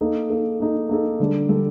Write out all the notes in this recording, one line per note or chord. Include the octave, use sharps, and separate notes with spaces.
A#3 D#4 A4
A#3 D#4 A4
A#3 D#4 A4
A#3 D#4 A4
D3 G3 D4 A4
D3 G3 D4 A4